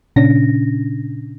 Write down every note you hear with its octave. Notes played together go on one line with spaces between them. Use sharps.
A#2 C#3 C#4 D4 A#6